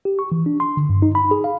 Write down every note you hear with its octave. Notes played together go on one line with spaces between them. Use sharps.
G4
C#6
E3
D4
C6
D3
G2
D#4
B5
G#4
F5